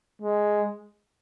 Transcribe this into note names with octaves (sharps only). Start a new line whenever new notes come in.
G#3